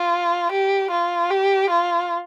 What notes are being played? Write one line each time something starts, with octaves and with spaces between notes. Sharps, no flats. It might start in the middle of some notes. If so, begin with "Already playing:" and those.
Already playing: F4
G4
F4
G4
F4